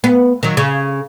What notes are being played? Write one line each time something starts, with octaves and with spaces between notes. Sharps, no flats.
B3
D#3 F#3
C#3